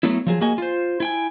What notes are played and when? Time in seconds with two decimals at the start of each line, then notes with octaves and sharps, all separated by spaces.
0.03 F#3 A3 B3 E4
0.27 F3 F#3 G#4
0.41 A#3 F#4 G#4 D#5 G#5
0.58 F4 C5
1.00 E4 G5 G#5